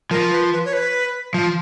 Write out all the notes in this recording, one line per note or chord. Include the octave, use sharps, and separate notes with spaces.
F3 A#4
B4
B4
C#5
B4
F3